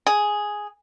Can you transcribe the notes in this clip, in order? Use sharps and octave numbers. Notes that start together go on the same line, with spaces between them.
G#4